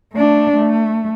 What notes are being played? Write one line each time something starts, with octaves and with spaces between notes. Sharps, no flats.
A3 D4
A3